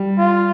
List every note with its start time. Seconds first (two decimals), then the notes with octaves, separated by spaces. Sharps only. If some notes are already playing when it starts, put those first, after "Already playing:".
Already playing: G3
0.18 F4